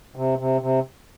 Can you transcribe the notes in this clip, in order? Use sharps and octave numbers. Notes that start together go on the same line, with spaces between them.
C3
C3
C3